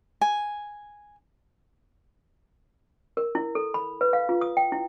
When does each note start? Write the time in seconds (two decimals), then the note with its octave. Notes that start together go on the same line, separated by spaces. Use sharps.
0.21 G#5
3.17 A#4
3.35 E4
3.55 A4
3.74 B5
4.01 B4
4.13 F5
4.29 F4
4.41 D#6
4.57 G5
4.72 E4